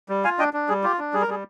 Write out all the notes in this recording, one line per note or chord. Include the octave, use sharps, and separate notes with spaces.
G3
F4 F5 G#5
D4 D#5 G5
D4
G3 G#4
F4 G4
D4
G3 G#4
A#4
G3 G#4